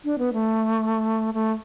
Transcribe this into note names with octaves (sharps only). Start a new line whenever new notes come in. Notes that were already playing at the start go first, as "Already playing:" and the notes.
D4
B3
A3
A3